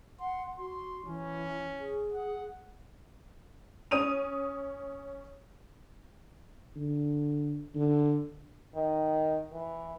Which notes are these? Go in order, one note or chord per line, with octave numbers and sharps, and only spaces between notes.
F#5 C6
F#4 C6
E3 C#4
G#4
F#5
C#4 D#6 D#7 F7
D3
D3
D#3
E3